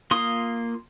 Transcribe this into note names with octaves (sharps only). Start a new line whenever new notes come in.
A#3 F4 C6 D#6